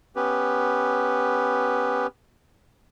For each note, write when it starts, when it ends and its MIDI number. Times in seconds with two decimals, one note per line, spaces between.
0.16 2.07 59
0.16 2.07 61
0.16 2.07 67
0.16 2.07 71